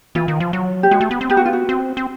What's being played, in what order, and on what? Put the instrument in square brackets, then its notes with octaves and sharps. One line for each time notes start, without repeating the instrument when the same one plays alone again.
[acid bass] E3 [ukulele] F4
[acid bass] D#3
F3
F#3
[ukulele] G4
[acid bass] G#3 [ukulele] F#4
[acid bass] A3
B3
C4
[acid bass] B3 [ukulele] G4
[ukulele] F#4
F4
F#4
[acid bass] C4
C4